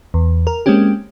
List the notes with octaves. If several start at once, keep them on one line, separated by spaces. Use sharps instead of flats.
E2
A#4
G#3 A#3 C4 C#4 G4